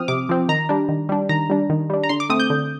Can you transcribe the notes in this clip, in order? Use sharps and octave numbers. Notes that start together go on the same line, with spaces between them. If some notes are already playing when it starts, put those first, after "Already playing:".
Already playing: F3 C4 D#6 F6
C3 D6
F3 C4
D#3 A#5
G3 D4
D#3
G3 D4
D#3 A#5
G3 D4
D#3
G3 D4
A#5
D3 C6
D6
A3 C4 D#6
G6
D3